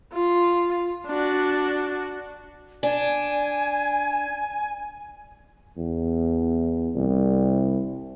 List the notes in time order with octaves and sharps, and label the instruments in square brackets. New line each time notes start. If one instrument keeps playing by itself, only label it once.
[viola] F4
D4 F#4
[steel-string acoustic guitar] D4 [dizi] G#5
[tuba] E2
C2